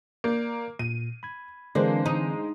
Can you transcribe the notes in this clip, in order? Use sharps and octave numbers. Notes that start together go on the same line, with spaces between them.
A#3 D5 G6
A#2 D#7
B5 G#6
D3 E3 G#3 A#3 C4 D4 C5
D#4